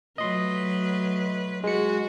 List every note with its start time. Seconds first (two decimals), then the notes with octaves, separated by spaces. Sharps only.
0.18 F#3 A3 B4 D#5 C6
1.64 G#3 F#4 C#7